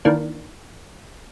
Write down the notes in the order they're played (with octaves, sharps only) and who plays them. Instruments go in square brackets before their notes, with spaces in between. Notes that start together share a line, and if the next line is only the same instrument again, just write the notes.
[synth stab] D#3 E3 A#3 D4